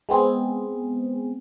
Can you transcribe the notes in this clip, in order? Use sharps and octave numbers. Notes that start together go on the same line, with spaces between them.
G#3 B3 C4 G#4